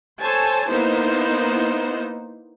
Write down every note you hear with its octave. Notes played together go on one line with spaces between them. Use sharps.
A4 C5 C#5 G#5 A5
A#3 B3 D#4 E4 C5